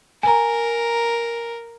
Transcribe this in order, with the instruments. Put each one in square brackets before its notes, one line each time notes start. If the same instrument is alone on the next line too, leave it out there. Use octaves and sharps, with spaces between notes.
[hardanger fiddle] A#4 [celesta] G#5 A#5